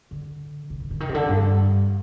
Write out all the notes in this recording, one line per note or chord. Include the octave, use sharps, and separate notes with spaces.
D3
C3
G#2
D3
D#3
C3
D3
G2